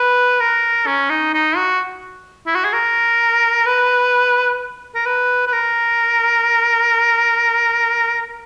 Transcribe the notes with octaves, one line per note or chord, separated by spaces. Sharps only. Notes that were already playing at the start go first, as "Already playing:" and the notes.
Already playing: B4
A#4
C#4
D#4
D#4
F#4
E4
F#4
G#4
A#4
B4
A#4
B4
B4
A#4